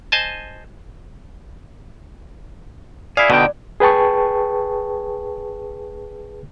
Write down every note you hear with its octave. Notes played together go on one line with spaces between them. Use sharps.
C5 D#5 G#5 A5
E4 G#4 D5 F5
B2 D3 D#4 G5
G#4 B4 G5 A5 C#6